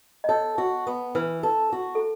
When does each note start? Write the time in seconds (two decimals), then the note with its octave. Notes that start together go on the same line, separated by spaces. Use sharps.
0.24 D#5
0.29 A4 C#5
0.58 F#4
0.87 B3
1.15 E3 B4
1.43 A4
1.72 F#4
1.95 A4